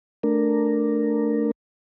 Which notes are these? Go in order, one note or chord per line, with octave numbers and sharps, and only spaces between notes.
A3 D4 A#4